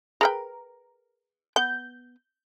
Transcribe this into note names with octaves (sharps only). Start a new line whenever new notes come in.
G#4 A#4 B4 G5
B3 G6